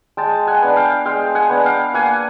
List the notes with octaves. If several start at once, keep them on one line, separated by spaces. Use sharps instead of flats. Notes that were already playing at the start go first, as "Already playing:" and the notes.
G#3 G5 A5
F#5 G#5
B3 D4
F5 G5
G#3 F5 G5
F#5 G#5
B3 D4
F5 G5
A#3 F#5 G#5